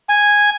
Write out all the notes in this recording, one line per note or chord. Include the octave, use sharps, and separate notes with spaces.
G#5